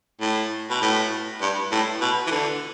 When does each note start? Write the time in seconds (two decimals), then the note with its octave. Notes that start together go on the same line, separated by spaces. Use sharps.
0.21 A2
0.70 B2
0.82 A2
1.41 G2
1.72 A2
2.01 B2
2.27 E3
2.31 D3